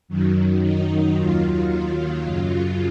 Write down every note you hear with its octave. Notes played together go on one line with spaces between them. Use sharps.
F#2 D#3 F#3
D#4
D#2 D#3 F#3 F4
F#2 C#3 F#3